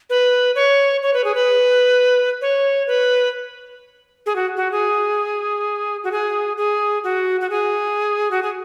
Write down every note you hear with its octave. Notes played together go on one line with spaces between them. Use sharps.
B4
C#5
C#5
B4
G#4
B4
C#5
B4
G#4
F#4
F#4
G#4
F#4
G#4
G#4
F#4
F#4
G#4
F#4
G#4